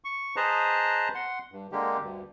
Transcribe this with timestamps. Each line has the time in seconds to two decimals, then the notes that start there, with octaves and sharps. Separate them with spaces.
0.04 C#6
0.36 G#4 B4 C5 D#5 A5 A#5
1.15 F#5 C6
1.52 G2
1.72 D3 G#3 A#3 G4
2.02 D2 G2